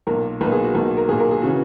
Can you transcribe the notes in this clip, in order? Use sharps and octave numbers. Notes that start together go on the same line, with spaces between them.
B1 A#2 A#4
B1 A#2 B4
G#4
F#4
B1 A#2
A#4
B1 A#2 G#4
A#4
G#4
C#3 E3 F#4